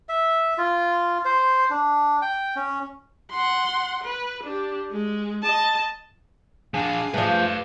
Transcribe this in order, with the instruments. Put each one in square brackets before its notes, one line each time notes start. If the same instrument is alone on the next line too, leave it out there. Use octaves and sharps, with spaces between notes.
[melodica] E5
F4
C5
D4
G5
C#4
[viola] F#5 C6
B4
D4 G4
G#3
D#5 A5
[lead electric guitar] F3 D4 [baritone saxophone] G#4 [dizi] F5
[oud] F3 A3 [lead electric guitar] B4 D5